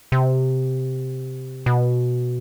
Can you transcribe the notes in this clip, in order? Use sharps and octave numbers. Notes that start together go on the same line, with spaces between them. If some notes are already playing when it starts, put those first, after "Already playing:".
C3
B2